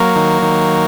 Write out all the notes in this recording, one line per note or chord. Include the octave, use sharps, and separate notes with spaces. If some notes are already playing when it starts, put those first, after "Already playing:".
Already playing: F#3 A#3
D#3
D#3